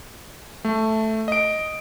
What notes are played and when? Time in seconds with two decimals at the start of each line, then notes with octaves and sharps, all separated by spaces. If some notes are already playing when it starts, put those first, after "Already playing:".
0.65 A3
1.28 D#5 D7